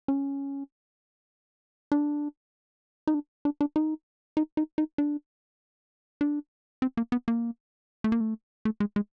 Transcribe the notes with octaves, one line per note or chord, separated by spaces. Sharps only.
C#4
D4
D#4
D4
D4
D4
D#4
D#4
D#4
D#4
D4
D4
C4
A#3
B3
A#3
A3
A#3
A3
A3
G#3
G#3